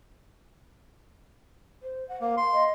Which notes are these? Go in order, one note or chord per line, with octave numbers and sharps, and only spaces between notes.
C5
F#5
A#3 F5
C6
D#5